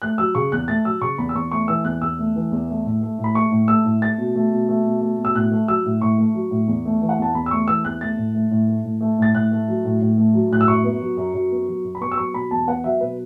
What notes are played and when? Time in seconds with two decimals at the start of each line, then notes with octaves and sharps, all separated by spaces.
0.02 A3 F#6
0.18 F#3 E6
0.35 C#3 C#6
0.52 E2 F#6
0.68 A3 A6
0.85 F#3 E6
1.01 C#3 C#6
1.18 E2 B5
1.29 E6
1.35 E2 C#6
1.51 A3 C#6
1.68 E3 E6
1.85 E2 F#6
2.02 E2 E6
2.19 A3
2.36 E3
2.52 E2
2.69 A3
2.85 A2
3.01 A3
3.18 A2
3.24 B5
3.35 A3 C#6
3.52 A2
3.68 A3 E6
3.85 A2
4.02 A3 A6
4.18 B2
4.36 A3
4.52 B2
4.69 A3
4.85 B2
5.01 A3
5.18 B2
5.25 E6
5.35 A2 F#6
5.52 A3
5.68 F#3 E6
5.85 A2
6.01 A2 C#6
6.18 A3
6.35 F#3
6.51 A2
6.68 E2
6.85 A3
7.02 E3
7.09 F#5
7.19 E2 A5
7.34 E2 B5
7.46 E6
7.51 A3 C#6
7.68 E3 E6
7.85 E2 F#6
8.01 A3 A6
8.17 A2
8.35 A3
8.51 A2
8.68 A3
8.85 A2
9.01 A3
9.19 A2 A6
9.35 A2 F#6
9.52 A3
9.68 F#3
9.85 A2
10.01 A2
10.17 A3
10.34 F#3
10.51 A2 F#6
10.61 E6
10.68 F#2 C#6
10.84 B3
11.01 F#3
11.17 F#2
11.34 F#2
11.52 B3
11.68 F#3
11.84 F#2
11.95 B5
12.01 B3 C#6
12.12 E6
12.18 F#3 C#6
12.34 B2 B5
12.51 E2 A5
12.67 B3 F#5
12.84 F#3 E5
13.01 B2 B4